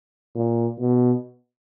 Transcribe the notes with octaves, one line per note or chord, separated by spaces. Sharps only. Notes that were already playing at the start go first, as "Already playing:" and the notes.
A#2
B2